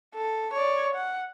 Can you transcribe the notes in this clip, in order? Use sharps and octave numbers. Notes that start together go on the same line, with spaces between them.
A4
C#5 D5
F#5